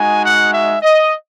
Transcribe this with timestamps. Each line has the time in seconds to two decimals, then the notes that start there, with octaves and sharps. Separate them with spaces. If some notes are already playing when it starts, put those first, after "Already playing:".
Already playing: G#3 D#4 F#4 G#5
0.25 F#5
0.53 E5
0.82 D#5